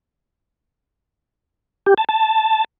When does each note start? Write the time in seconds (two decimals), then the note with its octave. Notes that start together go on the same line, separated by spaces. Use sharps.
1.86 G4
1.98 A5
2.09 A5